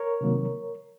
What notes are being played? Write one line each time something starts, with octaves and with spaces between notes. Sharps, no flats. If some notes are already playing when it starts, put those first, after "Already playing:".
Already playing: A#4 C#5
C3 D#3 F#3 A#3